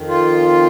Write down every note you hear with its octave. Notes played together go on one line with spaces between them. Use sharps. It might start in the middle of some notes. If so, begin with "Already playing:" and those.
Already playing: F2 D#3
F4